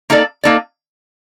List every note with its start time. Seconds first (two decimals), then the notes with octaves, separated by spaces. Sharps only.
0.10 A#3 D#4 A4 D5
0.44 A#3 D#4 A4 D5